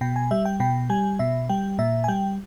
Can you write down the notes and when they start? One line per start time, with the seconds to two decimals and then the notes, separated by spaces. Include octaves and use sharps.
0.01 B2 G5
0.16 G#5
0.31 G3 E5
0.45 G5
0.60 B2 G5
0.90 G3 G#5
1.19 B2 E5
1.49 G3 G5
1.79 A#2 E5
2.04 G#5
2.08 G3 G5